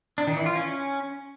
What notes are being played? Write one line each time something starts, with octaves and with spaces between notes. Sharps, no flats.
D4
D#3
E3
F4
C#4